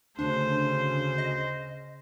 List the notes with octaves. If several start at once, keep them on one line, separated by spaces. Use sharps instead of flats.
D2 C#3 D4 C5
D#5